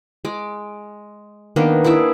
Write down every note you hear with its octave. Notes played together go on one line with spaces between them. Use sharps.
G#3 D6
D#3 A#3 B3 D4
E4 G#4 D5 E5